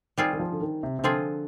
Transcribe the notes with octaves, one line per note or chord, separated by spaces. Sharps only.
D#3 G3 C4 F4 G#4
D#3
F3
D3
D#3
C3
C3
D3 F3 C4 F4 G#4